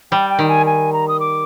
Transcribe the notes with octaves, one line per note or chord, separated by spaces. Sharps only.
G3 G5
G5
D#3
G#5
G#5
A#5
D#6
D6